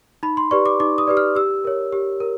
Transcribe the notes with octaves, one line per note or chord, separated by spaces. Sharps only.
D#4 B5
C6
G4 B4 D5 C#6
D6
D#4 D6
D#6
G4 B4 D5
F6
G4 E6
A#4 C#5
G4
A#4